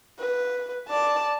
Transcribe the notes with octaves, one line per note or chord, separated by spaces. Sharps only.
B4
D5 A5